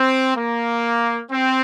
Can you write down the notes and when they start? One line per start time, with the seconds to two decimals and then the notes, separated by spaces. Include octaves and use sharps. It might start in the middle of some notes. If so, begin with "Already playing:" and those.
Already playing: C4
0.36 A#3
1.31 C4